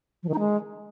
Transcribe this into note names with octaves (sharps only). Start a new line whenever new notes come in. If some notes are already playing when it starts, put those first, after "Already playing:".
F3
D#3
D#4
G#3